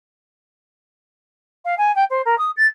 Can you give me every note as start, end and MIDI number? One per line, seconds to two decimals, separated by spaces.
1.65 1.75 77
1.78 1.94 80
1.95 2.04 79
2.10 2.22 72
2.25 2.38 70
2.38 2.51 87
2.57 2.67 93